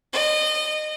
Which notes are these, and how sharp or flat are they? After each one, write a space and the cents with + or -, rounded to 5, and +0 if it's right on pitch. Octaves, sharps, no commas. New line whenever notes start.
D#5 -30